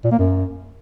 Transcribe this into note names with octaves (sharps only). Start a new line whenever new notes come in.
A#2
A#3
F#2